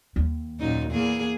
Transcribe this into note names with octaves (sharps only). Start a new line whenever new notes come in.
D#2
F#2 A#2 D#4
E2 A#3 G#4